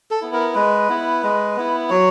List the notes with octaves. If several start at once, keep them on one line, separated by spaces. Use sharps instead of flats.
A4
B3 E4
A#4
G#3 B4
B3 E4
G#3
B3 E4
F#3 C#5